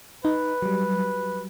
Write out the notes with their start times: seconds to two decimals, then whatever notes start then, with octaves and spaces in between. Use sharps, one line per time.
0.25 D#4 B4
0.62 F#3 G3